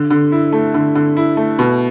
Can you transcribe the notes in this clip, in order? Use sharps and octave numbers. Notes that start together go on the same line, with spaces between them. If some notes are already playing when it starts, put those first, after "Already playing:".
Already playing: D3
D3
E4
A3
D3
D3
E4
A3
B2